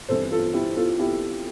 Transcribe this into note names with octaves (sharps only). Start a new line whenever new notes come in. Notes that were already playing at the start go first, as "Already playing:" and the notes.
G1 F2 E3 G3 A4 C5
F4 A4
E4 G4
F4 A4
E4 G4